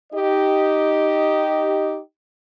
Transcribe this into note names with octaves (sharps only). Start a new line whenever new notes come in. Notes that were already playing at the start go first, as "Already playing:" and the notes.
D#4 G4 D#5